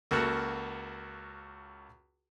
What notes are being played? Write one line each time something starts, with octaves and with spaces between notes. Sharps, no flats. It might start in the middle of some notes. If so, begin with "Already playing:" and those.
C#2 A#3 F#4 A4 F#5 F6